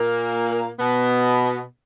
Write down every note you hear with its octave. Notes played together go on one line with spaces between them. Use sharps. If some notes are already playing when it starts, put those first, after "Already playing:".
Already playing: A#2 A#3
B2 B3